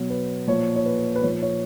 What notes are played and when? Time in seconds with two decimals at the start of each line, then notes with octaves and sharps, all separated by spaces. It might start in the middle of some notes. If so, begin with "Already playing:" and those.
Already playing: B2 F#3
0.10 B4
0.47 A#2 F3 C#5
0.76 C#5
0.86 B4
1.16 B4
1.23 A#2 F3 C#5
1.42 C#5